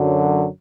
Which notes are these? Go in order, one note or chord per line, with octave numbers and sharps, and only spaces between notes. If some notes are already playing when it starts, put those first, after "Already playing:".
Already playing: F#2 D3 F#3